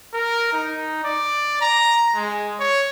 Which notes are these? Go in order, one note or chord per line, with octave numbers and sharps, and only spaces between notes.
A#4
D#4
D5
A#5
G#3
C#5